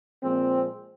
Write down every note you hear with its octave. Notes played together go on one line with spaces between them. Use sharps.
A#2 F3 G#3 C4